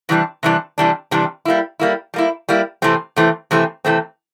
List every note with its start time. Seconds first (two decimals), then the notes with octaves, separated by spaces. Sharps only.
0.09 C3 E3 G3 D4
0.43 C3 E3 G3 D4
0.78 C3 E3 G3 D4
1.11 C3 E3 G3 D4
1.45 G3 A#3 E4
1.80 G3 A#3 E4
2.14 G3 A#3 E4
2.49 G3 A#3 E4
2.82 C3 E3 A3 C4
3.16 C3 E3 A3 C4
3.51 C3 E3 A3 C4
3.85 C3 E3 A3 C4